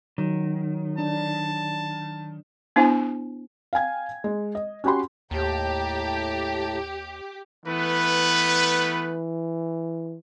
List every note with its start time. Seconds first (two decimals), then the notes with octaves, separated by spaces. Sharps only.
0.18 D#3 F#3
0.98 D4 A5
2.76 B3 D4 E4 C5 G#5
3.73 F5 G5 G#5 G#6
4.24 G#3
4.55 D#5
4.84 C#4 F#4 G4 B5 C6
5.31 D#2 A2 G4 A5 A#5
7.65 E3 A3 B3 B4